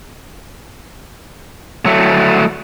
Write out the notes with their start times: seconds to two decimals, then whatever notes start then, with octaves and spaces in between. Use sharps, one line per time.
1.86 F#3 A3